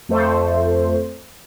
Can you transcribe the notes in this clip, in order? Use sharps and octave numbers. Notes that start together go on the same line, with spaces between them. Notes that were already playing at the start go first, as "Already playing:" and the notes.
F2 A3 C5